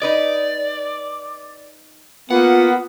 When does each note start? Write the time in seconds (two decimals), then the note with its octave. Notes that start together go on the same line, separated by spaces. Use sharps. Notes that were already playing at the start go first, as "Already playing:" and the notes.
0.02 D#4 B4 D5 D#5
2.30 A#3 B3 F4 F#5